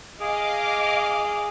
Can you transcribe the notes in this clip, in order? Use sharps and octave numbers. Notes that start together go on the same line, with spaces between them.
G#4 D#5 F5 D6